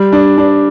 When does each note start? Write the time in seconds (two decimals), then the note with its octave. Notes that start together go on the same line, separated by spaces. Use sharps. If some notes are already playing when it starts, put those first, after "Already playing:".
Already playing: G3
0.12 D4
0.38 D4